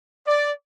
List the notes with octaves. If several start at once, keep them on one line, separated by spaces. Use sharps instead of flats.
D5